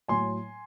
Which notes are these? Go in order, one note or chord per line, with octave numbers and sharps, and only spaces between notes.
A2 F#3 G#5 C6